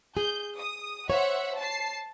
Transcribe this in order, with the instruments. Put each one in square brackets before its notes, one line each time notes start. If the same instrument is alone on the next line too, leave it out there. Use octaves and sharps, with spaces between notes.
[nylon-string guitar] G#4 [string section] G6
[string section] D#6
[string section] C5 E5 F#5 [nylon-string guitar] C#5
[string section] A5 C7